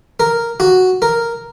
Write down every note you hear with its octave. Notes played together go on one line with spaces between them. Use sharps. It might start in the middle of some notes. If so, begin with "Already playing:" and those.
A#4
F#4
A#4